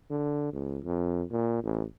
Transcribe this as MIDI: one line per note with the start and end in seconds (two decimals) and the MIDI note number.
0.11 0.49 50
0.53 0.79 37
0.84 1.23 41
1.31 1.61 46
1.63 1.83 33